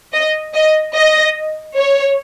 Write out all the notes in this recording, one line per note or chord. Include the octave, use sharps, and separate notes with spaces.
D#5
D#5
D#5
C#5